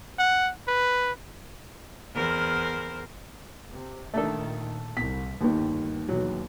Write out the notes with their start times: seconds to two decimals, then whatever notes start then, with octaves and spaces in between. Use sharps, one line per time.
0.19 F#5
0.68 B4
2.14 E2 A#4 C5
3.72 C3
4.14 A#2 D#3 A3 D4 A4
4.97 C2 B6
5.41 G1 D#2 D#3
6.08 B1 E2 F#3